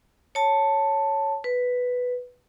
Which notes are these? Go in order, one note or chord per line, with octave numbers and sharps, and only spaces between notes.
C#5 A5
B4